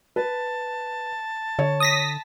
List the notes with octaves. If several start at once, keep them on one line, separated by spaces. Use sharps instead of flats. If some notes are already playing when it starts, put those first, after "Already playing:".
B4 A5
D3 C#5
D#6 A#6 B6